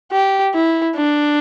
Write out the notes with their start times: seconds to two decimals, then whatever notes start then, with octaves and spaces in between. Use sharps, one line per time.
0.13 G4
0.55 E4
0.97 D4